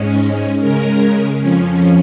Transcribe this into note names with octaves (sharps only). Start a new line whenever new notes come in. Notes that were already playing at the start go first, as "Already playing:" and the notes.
Already playing: G#2 G#3 C#4
C#3 G#3 C#4 A#4
F2 F3 C#4